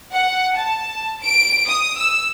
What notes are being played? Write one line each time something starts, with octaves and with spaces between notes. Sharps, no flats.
F#5
A5
D7
D#6
E6